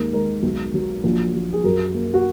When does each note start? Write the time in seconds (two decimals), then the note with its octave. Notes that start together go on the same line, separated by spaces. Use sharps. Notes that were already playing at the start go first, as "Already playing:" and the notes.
Already playing: D#2 G#3 A#4
0.13 G#3 A#4
0.43 B1
0.74 F#3
1.04 A#1
1.34 F#3
1.53 G#4
1.64 F#2 A#4
1.94 A#3
2.14 F#4